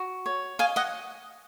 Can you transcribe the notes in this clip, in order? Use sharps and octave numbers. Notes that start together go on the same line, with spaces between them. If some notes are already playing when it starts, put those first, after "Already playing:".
Already playing: F#4
C#5
D#5 F5 G#5
D#5 F#5